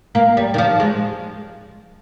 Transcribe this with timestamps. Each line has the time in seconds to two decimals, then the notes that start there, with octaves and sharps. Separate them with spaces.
0.15 A#3
0.37 G3
0.54 D#3
0.58 F3
0.80 G#3